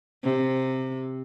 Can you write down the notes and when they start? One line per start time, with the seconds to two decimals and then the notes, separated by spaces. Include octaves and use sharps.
0.23 C3